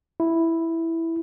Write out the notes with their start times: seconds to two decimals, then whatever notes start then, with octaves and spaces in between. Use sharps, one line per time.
0.20 E4